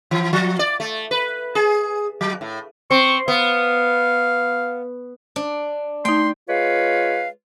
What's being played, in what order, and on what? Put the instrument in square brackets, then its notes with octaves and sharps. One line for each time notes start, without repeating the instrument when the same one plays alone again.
[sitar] E3
F3
D5
A3
B4
G#4
F#3
A2
[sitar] C4 [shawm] C#6
[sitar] B3 [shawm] F5
[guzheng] D4
[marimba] A3 D#4 [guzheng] G5 [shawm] C6
[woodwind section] G#3 F4 B4 C#5 F5